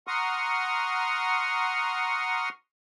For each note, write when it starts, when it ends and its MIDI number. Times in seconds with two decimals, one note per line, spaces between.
0.07 2.49 78
0.07 2.49 82
0.07 2.49 84
0.07 2.49 85
0.07 2.49 87
0.07 2.49 89